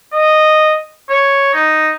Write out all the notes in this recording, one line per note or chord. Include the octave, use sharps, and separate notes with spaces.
D#5
C#5
D#4